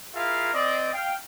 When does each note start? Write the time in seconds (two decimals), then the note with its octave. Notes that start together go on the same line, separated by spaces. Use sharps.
0.15 E4 F4 G#4 A#4 E5 F5
0.53 C4 D5 D#5
0.93 F5 G5